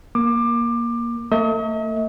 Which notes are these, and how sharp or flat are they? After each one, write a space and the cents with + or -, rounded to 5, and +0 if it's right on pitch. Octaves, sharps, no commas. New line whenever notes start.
A#3 +15 D6 +20
A3 +45 D#5 +45